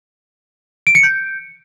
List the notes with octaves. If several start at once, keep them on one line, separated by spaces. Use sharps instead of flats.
D7
C#7
G6